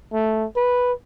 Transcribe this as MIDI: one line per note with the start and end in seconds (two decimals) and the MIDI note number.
0.13 0.46 57
0.56 0.92 71